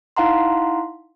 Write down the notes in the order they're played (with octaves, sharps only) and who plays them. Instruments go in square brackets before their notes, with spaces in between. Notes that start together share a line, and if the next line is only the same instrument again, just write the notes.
[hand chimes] D#4 E4 F5 F#5 A#5 C6